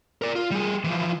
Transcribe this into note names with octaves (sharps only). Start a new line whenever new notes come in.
A#4 D5
F4
G3 G#4
E3 F3